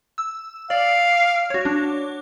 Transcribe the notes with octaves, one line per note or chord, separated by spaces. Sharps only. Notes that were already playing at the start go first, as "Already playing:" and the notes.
E6
D5 F5
F#4 C#5
D4